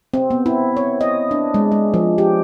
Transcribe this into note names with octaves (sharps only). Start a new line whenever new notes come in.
C4
B3
E4
C#5
D#5
D4
G#3
G#3
F3
G4